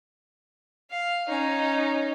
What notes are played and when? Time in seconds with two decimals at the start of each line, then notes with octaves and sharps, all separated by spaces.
0.90 F5
1.29 C#4 D#4